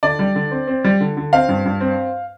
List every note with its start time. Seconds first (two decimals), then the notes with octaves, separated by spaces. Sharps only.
0.03 D3 D5
0.19 G3
0.35 D3
0.51 C4
0.67 C4
0.84 G3
1.00 D3
1.17 D3
1.33 C4 F5
1.48 G2
1.65 G2
1.80 C4